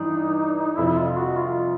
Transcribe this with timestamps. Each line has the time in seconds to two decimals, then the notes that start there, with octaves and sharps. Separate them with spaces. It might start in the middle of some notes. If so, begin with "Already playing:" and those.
Already playing: G2 E3 D4 D#4
0.78 F2 C3 F3 E4
0.97 F4
1.16 F#4
1.36 F4